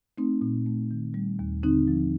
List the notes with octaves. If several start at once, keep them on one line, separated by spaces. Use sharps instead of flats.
A3 C4 D#4
A#2
A3
D#3
G3
D#2
D3 C4 D#4
F3